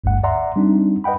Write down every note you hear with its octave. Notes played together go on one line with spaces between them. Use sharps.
G1 D2 G2 F#5
D5 E5 F#5 A#5 C6
G3 C4 D4 D#4
B4 D#5 F#5 G5 B5